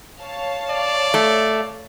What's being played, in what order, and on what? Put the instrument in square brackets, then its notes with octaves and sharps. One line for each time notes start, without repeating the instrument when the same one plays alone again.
[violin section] C#5 F5 A5
[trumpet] D5
[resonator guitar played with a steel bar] A3